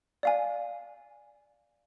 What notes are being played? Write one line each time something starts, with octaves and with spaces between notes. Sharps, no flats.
D5 F5 G#5